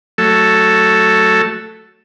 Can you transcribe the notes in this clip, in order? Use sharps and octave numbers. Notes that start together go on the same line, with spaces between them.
F#3 A3 A4